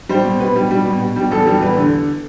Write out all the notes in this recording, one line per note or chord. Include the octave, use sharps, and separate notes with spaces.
G3 C5
B2
B2 B4
G3
G3
B2
B2
G3
E2 A4
G3
E2 B4
D3